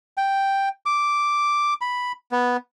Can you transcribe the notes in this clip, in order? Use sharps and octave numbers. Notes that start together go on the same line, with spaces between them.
G5
D6
B5
B3